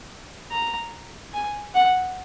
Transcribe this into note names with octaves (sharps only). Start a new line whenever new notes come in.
A#5
G#5
F#5